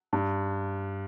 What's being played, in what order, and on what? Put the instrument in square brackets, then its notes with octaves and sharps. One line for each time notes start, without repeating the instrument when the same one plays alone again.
[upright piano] G2